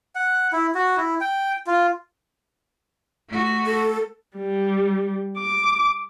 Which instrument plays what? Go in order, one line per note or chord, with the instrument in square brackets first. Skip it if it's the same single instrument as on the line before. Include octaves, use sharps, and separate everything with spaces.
[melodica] F#5
E4
F#4
E4
G5
F4
[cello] A3 F#4
[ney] A4
[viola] G3
D6